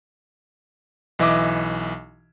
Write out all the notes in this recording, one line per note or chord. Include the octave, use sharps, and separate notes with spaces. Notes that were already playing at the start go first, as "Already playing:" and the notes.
B1 E3 D#5 E5 D6